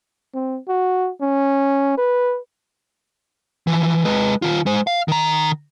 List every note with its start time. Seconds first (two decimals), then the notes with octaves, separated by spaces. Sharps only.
0.35 C4
0.68 F#4
1.21 C#4
1.98 B4
3.67 E3 F3
4.05 G#3 B4
4.42 D#3 F4
4.66 G#3 C5
4.87 F5
5.08 D#3 A#5